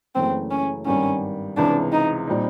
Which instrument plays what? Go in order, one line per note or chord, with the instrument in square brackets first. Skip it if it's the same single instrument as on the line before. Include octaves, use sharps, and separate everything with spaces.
[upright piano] F#1 F#2 C#3 E3 A3 [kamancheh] C4
[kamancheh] C#4
[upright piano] G#1 G2 D#3 G3 [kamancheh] C#4
[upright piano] C#2 C3 E3 [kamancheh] D4
[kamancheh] D#4
[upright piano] A#2 G3 C4 D#4